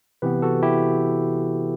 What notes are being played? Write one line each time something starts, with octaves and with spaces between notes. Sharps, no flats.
C3 E3 B3 G4 B4
F#4 A4
E4 G4